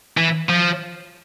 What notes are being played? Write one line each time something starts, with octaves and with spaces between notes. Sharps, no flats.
E3
F3